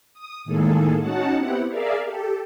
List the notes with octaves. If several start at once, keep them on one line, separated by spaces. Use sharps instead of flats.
D#6
A2 D#3 G#3 A#3 G#4 A4
C#4 D#4 F#4 F#5 A5
B3 C4 E4 G4 F#5
G#4 A#4 D5 E5 F5
G4 A4